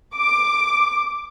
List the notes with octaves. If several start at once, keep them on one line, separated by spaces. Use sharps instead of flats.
D6